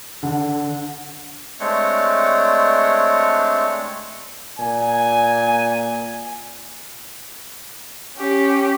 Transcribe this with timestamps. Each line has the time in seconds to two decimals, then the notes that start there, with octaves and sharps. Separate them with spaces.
0.23 D3
1.60 G#3 A3 C4 D4 C#5
4.58 A#2 G#5
8.18 C#4 G4